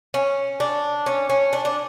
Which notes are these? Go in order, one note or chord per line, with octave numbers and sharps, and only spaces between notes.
C#4
D4
C#4
C#4
D4
D4